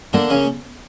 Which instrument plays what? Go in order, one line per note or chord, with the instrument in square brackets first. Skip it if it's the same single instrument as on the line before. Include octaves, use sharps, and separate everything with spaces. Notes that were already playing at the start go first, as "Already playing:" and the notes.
[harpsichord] D3 D4 [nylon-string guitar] A#3
[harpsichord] C#3 C#4